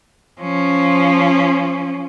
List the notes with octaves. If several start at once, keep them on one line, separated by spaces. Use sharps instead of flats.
F3 C#4